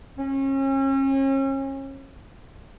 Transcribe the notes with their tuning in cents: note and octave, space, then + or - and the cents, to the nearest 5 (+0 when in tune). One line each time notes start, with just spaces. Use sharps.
C#4 -35